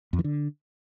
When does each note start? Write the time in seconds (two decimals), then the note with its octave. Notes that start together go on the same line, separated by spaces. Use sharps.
0.13 F2
0.19 E3
0.24 D3